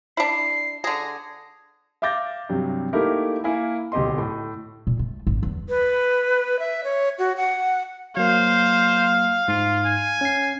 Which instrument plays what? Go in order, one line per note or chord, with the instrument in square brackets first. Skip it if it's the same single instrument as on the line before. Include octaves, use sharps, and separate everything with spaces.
[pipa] D4 E4 [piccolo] C7
[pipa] D3 G#4 [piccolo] A#6
[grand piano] E5 F5 D6 G6 A6 A#6
G2 C3 F#3
A3 A#3 D#4 E4 G4 A#4
A#3 E4 A#4 E5 G#5
D1 B1 G4 D#5 C6
A2
[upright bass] A#2
A3
G#1
E2
[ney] B4
E5
C#5
F#4
F#5
[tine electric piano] F#3 A#3 [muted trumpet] C5 [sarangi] F5
[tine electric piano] G#2 [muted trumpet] F4
[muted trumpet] G#5
[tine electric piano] C#4 C7